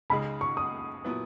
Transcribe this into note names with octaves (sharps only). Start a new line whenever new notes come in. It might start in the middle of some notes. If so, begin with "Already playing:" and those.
C#2 C#3 G#3 D#4 G#4 B5
C#6
D#6
A#2 F#3 B3 E4 B4